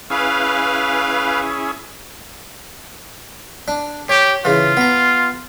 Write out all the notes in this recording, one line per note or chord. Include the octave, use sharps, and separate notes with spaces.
C#4 E4 G#4 B4 F5
D4
G4 C#5
C#3 E3 F4
B3 A#5